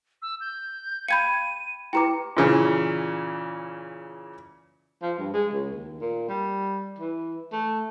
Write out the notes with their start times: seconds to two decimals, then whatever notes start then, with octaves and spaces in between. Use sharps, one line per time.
0.22 E6
0.41 G6
1.08 F5 G5 B5 G6 G#6 C#7 D#7
1.93 E4 G4 B4 G5 A#5 D6 C#7
2.37 A#2 C#3 E3
5.02 F3
5.19 G2
5.33 G#3
5.53 C#2
5.73 D#2
6.01 A#2
6.29 G3
6.99 E3
7.53 A3